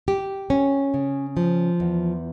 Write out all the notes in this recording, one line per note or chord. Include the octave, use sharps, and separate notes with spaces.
G4
C#4
C#3
F3
E2